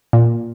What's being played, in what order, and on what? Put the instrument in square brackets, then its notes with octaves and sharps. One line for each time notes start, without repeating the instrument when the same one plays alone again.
[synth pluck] A#2